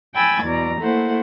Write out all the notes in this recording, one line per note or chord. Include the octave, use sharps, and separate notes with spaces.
G5 G#5 B5 E6 G#6 A6
E2 B2 D5 A#5
A3 A#3 E4 C5 F#5